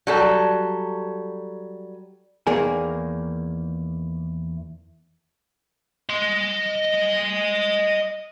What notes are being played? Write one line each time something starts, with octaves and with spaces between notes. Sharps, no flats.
F#3 G3 A4
E2 D#3 A#3 G#4 A#4 G#5
D#5 C6